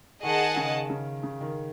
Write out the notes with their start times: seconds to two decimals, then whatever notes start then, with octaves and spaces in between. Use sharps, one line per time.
0.22 D#3 G#4 D#5 F#5 A5
0.56 C#3
0.90 C#3
1.23 C#3
1.41 D#3